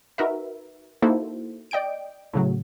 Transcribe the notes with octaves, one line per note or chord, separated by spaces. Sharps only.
D#4 F#4 A#4 B4 E5
A#3 D#4 E4 F#4 A4 C5
D5 D#5 G5 G6 D7
A2 C#3 F#3